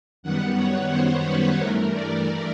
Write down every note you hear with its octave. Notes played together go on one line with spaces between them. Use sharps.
F#2 D#3 G3 B3 F#5
C#5
C5
B4
G2 E3 A3 A#4
D5